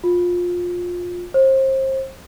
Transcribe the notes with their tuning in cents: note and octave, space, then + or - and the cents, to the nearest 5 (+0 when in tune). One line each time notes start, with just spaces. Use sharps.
F4 +20
C5 +30